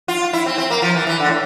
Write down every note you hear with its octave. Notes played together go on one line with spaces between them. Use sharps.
F4
E4
C4
C4
A#3
F3
E3
E3
D3
A2